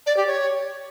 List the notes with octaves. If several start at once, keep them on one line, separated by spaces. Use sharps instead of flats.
D5
G4
C#5